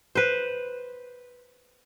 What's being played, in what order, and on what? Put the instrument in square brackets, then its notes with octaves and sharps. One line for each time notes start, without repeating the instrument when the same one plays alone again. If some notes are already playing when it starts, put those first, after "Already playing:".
[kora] B4 C5